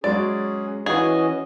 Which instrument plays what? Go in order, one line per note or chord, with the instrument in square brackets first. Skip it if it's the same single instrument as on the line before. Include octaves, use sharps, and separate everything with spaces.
[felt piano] F#3 G#3 F#4 [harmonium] C#4 G#4 [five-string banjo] D5
[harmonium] E3 C#4 D#5 [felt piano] F#4 F#5 [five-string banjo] G#4